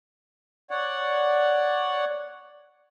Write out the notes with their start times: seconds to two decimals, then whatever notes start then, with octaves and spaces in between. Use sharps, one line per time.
0.71 C#5 D5 F#5